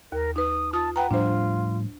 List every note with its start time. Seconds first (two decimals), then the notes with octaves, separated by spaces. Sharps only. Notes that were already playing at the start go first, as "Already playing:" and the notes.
0.12 D#2 A#4
0.36 D#4 B4 D#6
0.73 F4 A5 D#6
0.96 B4 F#5 G5 A#5
1.11 A2 F3 G3 D4 F4 C5